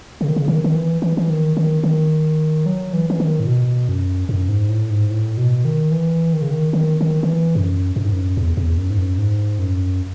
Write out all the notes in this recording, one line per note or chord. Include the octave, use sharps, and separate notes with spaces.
C#3
D#3
C#3
D#3
D#3
E3
E3
E3
D#3
D#3
D#3
F#3
E3
E3
D#3
A2
B2
F#2
F#2
G#2
A2
G#2
A2
B2
D#3
E3
D#3
C#3
D#3
D#3
D#3
D#3
E3
F#2
F#2
G#2
F#2
E2
E2
F#2
G#2
F#2
G#2
F#2